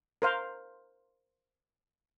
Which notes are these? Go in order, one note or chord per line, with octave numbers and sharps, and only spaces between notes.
A#4 C5 F5